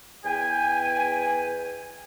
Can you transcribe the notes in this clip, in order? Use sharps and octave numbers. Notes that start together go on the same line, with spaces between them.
E2 B4 G5 G#5